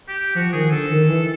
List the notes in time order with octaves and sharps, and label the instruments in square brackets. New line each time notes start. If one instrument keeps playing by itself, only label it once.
[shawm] G4
[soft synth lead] F3 [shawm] F#4
[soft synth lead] D#3 [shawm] G#4
[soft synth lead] D3 [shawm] A4
[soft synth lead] D#3
E3